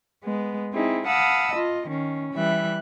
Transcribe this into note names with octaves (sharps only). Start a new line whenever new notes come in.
G#3 B3
C4 D#4 E4 G#4
F5 F#5 A5 B5 D#6 E6
F4 D#5
D#3 C#4
E3 G3 E5 F#6